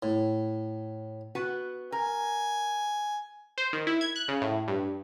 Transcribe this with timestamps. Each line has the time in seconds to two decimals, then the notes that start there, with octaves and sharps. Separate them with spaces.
0.03 A2
1.35 B3 F#4 B4
1.92 A#4 G#5
3.58 C5
3.73 D#3
3.87 E4
4.01 G#6
4.16 F#6
4.28 C#3
4.42 A2
4.68 G2